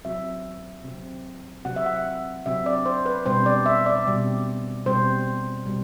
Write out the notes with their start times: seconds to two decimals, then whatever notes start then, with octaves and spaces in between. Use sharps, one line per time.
0.04 C3 F#3 C4 E5
0.84 C3 F#3 C4
1.65 C3 F#3 C4 F#5
1.76 E5
1.86 F#5
2.46 C3 F#3 C4 E5
2.66 D5
2.86 C5
3.06 B4
3.25 B2 G3 C4 C5
3.46 D5
3.66 E5
3.86 D5
4.06 B2 G3 C4
4.86 B2 G3 C4 C5
5.66 B2 G3 C4